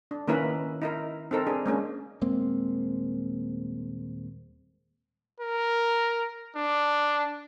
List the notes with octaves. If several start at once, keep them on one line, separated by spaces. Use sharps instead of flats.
D4
D#3 A#3 C#4 E4 A#4 B4
D#4 E4 A#4
C4 D#4 A4 A#4
D4 G#4
G#3 A#3 C#4 D4
D#1 G#3 A#3 C4
A#4
D4